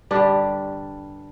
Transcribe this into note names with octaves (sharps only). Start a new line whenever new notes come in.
G2 D3 G3 D4